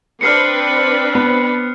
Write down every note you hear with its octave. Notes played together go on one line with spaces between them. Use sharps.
C4 D4 B4 F6 C7 C#7
B3